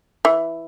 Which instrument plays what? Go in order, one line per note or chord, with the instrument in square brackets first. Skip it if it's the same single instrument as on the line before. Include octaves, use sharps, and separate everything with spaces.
[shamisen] E3